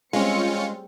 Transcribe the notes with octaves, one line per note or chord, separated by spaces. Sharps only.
G3 G#3 C4 C#4 F4 C#7